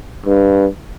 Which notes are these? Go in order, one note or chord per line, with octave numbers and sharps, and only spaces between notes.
G2